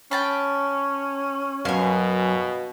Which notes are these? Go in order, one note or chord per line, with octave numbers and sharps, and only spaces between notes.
C#4 G5 A5 B5
F#2 B2 F5 G#5